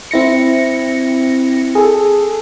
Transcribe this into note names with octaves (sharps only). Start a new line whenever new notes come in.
C4 E4 A#6 C#7
G#4 A4